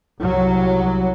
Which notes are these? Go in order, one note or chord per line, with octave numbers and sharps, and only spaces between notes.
C2 F#3